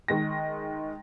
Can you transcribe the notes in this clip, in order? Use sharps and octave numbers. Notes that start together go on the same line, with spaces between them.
D#3 G#3 A#6